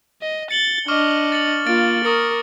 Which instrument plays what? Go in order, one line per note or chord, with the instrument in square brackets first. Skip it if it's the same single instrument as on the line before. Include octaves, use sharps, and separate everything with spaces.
[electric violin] D#5
[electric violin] A6 [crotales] C#7 F#7 G7
[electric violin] D4 D#5 [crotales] C#6 D6 F6
[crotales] A6 C#7 F#7
[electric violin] A#3 F4 [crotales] A6 D7
[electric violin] A#4 [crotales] C#6 D#6 C#7